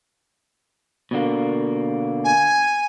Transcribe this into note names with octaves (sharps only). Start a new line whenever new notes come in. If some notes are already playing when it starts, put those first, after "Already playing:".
B2 D3 A#3
G#5